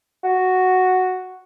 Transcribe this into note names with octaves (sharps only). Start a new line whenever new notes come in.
F#4